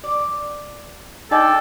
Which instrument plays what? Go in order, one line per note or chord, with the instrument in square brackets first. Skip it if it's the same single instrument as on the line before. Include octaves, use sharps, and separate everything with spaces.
[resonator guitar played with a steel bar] D5
[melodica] D4 D5 G5 [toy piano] D#4 D#5 [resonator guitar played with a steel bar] G#4 [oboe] A4